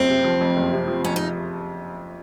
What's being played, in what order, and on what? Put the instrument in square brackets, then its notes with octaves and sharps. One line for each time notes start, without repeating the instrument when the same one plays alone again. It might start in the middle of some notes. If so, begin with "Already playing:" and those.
Already playing: [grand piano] F#1 F2 F3 [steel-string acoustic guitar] C4
[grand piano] C3
F3
F2
F#1
C3
F3
[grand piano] F2 [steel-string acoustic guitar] C#4
[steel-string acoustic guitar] D#4